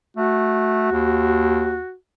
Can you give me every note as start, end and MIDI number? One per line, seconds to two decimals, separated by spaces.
0.16 0.91 57
0.16 1.94 66
0.92 1.79 39